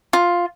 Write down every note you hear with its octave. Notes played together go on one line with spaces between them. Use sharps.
F4